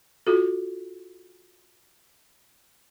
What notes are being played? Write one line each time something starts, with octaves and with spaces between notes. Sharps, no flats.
F4 F#4 A4